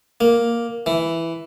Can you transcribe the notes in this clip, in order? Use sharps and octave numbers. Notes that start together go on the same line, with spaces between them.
A#3
E3